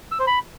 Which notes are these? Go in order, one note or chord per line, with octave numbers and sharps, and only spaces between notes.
E6
C5
B5